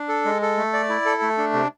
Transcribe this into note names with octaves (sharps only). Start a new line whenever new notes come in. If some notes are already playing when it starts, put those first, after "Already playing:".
Already playing: D4
A4
G#3
A4
A3
D5
E4
A4
A3
D4
C3